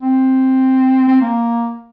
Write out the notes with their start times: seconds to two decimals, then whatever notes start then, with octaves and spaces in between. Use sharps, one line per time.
0.02 C4
1.08 C4
1.21 A#3